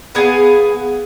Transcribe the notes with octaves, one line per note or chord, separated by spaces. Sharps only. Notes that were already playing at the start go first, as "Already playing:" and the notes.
B3 G#4 F5 G#5